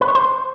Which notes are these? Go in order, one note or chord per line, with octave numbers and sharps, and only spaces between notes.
B4
C#5
C5